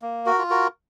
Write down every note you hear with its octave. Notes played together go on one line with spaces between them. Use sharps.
A#3
F#4 A#4
F4
F#4 A#4